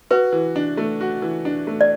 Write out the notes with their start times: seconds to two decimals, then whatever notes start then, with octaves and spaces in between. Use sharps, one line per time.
0.11 F#4 B4
0.32 E3
0.56 D4
0.77 A3
1.01 F#4
1.22 E3
1.45 D4
1.67 A3
1.81 D5